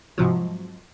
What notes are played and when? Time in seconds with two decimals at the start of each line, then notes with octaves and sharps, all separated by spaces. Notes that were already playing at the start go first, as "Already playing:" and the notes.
0.18 G#2 C3 F3 F#3